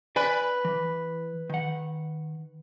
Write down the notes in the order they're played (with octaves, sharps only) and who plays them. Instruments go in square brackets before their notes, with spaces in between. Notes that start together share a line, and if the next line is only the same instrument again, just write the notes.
[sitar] B4 [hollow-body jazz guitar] D5 G#5
[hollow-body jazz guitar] E3
D#3 F#5